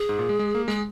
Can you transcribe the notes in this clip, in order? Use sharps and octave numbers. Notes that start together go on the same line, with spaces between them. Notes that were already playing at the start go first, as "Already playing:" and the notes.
Already playing: G#4
G#2
A#2
G#3
G#3
A#3
G#3 G#4